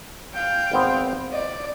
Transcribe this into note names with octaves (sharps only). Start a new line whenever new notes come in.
F5 G5
G#1 B3 C4
D5 D#5